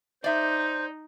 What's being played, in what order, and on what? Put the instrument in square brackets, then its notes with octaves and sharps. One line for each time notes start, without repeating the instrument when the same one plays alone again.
[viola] D#4 [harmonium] C5 [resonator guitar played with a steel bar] D5 E5